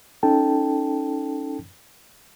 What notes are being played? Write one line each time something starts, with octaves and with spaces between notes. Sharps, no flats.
C#4 D#4 A4 G5 A5